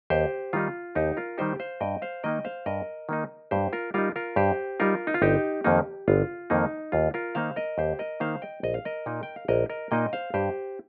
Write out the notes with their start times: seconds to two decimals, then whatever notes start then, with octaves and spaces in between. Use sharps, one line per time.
0.10 D#2 G4 C5
0.53 D#3 G3 D#4 F4
0.95 D#2 D#4 G4
1.17 F4 A#4
1.38 D#3 G3 D#4 G4 C5
1.60 C5 F5
1.81 G2 D#5 G5
2.02 C5 F5
2.23 D#3 A#3 D#4 D#5 G5
2.45 C5 F5
2.66 G2 A#4 D#5
3.09 D#3 A#3 D#4
3.51 G2 G4 C5
3.73 F4 A#4
3.94 G3 D#4 F4 A#4
4.16 F4 A#4
4.36 G2 G4 C5
4.80 G3 D#4 F4 A#4
5.07 D#4
5.14 F4
5.22 G1 D#4 G4
5.64 F2 D#3 A#3 D#4
6.08 G1 F4
6.50 F2 D#3 A#3 D#4
6.92 D#2 F4
7.14 F4 A#4
7.35 D#3 A#3 D#4 C5 F5
7.56 A#4 D#5
7.78 D#2 G4 C5
7.99 A#4 D#5
8.20 D#3 A#3 D#4 C5 F5
8.42 D#5 G5
8.63 A#1 D#5
8.74 F5
8.85 A#4 D#5
9.06 A#2 A#3 D#4
9.23 G5
9.36 F5
9.48 A#1 A#4 D#5
9.70 A#4 D#5
9.91 A#2 A#3 D#4 D#5 G5
10.13 C5 F5
10.34 G2 G4 C5